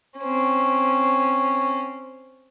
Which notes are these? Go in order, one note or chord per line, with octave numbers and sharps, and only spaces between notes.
C4 C#4